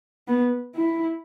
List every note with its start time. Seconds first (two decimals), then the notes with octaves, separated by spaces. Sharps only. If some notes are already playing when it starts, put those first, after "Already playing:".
0.28 B3
0.75 E4